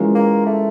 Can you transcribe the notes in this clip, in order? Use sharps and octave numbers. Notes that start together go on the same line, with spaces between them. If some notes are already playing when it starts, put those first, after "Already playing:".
Already playing: E3 G#3 C#4 F4 A#4
A#3
A3